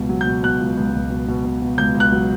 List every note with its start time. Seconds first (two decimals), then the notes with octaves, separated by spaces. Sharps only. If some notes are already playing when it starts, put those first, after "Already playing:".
Already playing: C#2 B2
0.09 F#3
0.21 G6
0.27 B2
0.43 B2 F#6
0.60 C#2
0.77 C#2
0.93 C#2
1.10 B2
1.28 B2
1.45 B2
1.62 B2
1.78 C#2 G6
1.95 C#2
2.00 F#6
2.12 F#3